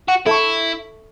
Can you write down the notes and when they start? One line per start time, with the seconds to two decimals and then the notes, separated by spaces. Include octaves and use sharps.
0.08 F#4
0.26 E4 A4 E5 A5 C#6